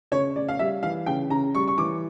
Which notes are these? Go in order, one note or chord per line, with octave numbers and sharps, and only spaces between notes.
C#3 C#5
C#3 D5
F5
G3 E5
E3 F5
C#3 G5
C#3 A#5
G3 C#6
C#6
E3 D6